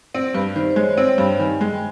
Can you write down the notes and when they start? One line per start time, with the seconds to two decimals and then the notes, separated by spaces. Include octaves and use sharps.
0.15 C4 D5
0.34 G2 B4
0.56 D#3 C5
0.71 C5
0.76 G#3 C#5
0.92 D5
0.97 C4
1.08 G5
1.18 G2
1.24 G5
1.39 D#3 G#5
1.60 G#3 G5